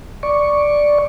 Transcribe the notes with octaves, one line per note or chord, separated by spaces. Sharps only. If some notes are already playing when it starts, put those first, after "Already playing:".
D5 C#6